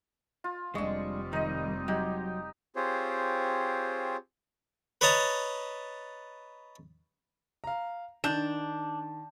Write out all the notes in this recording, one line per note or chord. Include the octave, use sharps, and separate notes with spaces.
F4
F1 G3 G#3 C4 D4 D#5 C#6
D#3 D#4 D#5
F#3 D#4 G4
C4 F4 G4 G#4 C5 C#5
B4 C#5 D#5 A5 A#5
F5 A#5
D#3 D4 G6 E7